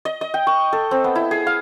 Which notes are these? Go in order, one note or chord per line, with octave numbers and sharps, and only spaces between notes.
D#5
D#5
G5
C#6
A4
C4
B3
E4
G#4
F5